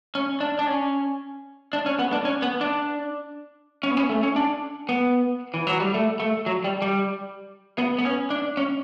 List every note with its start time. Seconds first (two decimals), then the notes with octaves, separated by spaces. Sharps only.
0.15 C#4
0.41 D4
0.59 D4
0.67 C#4
1.73 D4
1.86 C#4
1.99 B3
2.13 D4
2.25 C#4
2.42 B3
2.61 D4
3.83 C#4
3.91 B3
3.97 C#4
4.09 A3
4.23 C#4
4.36 D4
4.89 B3
5.54 E3
5.67 F#3
5.80 G3
5.94 A3
6.20 A3
6.46 F#3
6.64 G3
6.82 G3
7.78 B3
7.98 B3
8.05 C#4
8.30 D4
8.57 C#4